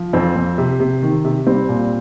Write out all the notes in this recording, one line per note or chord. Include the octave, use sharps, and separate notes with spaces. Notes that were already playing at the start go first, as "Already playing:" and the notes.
Already playing: F3
F2 C4
F2
C3
C3
D#3
C3
G3 C4
A#2